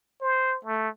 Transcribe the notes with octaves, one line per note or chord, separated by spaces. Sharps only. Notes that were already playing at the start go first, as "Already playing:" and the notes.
C5
A3